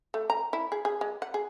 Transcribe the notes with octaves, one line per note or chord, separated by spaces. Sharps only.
A3
A#5
E4
G#4
G#4
G#3
F#5
G#4